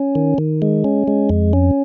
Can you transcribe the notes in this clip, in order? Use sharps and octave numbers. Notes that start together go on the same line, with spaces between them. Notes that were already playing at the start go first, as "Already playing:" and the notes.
Already playing: C#4
D#3
D#3
G#3
C#4
G#3
F2
C#4